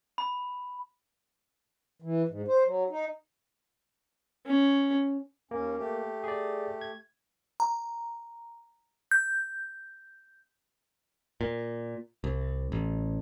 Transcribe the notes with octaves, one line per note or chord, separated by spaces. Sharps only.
B5
E3
G#2
C5
F#3
D#4
C#4
D#2 A#3 C#4
A3 G4
G#4 D5
G#6
A#5
G6
A#2
C2
A1